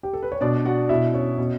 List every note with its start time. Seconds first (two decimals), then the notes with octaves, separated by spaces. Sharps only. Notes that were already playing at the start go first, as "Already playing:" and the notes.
0.03 G4
0.13 A4
0.23 B4
0.32 C#5
0.41 B2 D4 D5
0.65 F#4 F#5
0.89 B2 E4 E5
1.13 C#4 C#5
1.38 B2